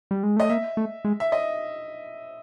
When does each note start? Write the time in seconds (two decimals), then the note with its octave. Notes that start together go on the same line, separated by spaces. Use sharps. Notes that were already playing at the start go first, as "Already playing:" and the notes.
0.11 G3
0.23 G#3
0.37 A3 D#5
0.50 A#3 E5
0.77 A3
1.05 G#3
1.20 E5
1.32 D#5